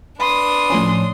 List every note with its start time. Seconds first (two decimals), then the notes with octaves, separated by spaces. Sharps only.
0.20 D4 B4 C6 D#6
0.70 A2 F3 C#4